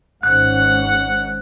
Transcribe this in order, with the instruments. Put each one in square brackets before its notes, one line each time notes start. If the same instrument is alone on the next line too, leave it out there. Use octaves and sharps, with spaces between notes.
[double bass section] G#1 G#2 C#4 [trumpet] F#5 [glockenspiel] F#6